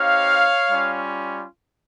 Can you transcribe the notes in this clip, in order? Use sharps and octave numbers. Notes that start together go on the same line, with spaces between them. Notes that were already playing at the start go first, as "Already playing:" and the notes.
Already playing: C4 D#4 G4 C#5 F5
G3 C#4 F4